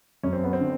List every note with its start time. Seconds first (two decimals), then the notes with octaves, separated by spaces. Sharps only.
0.23 F#2 C#4
0.33 C4
0.44 B3
0.53 C4
0.60 D3